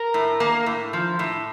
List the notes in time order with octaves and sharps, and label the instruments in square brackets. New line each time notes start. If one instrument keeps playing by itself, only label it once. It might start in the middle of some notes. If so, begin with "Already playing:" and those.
Already playing: [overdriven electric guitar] A#4
[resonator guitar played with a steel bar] A2
A#3
A2
F3
A2